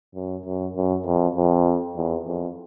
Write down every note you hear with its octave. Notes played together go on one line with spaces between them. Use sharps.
F#2
F#2
F#2
F2
F2
E2
F2